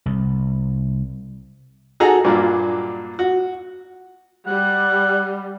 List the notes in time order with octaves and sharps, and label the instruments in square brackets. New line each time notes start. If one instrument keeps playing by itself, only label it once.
[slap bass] C2
[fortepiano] D#4 F#4 G#4 A4 G#5 A#5
G2 A#2 F#3 A#3 D4
F#4
[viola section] G3 [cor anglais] F#5